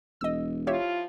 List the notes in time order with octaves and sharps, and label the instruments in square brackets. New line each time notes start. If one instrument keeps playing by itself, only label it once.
[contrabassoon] E1 [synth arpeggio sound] D#5 E6
[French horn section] F3 E4 F4 [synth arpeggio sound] G4 C#5 E5